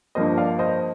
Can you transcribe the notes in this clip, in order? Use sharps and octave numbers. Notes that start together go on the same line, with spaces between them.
G2 F3 A#3 C5 D#5
D5 F5
C5 D#5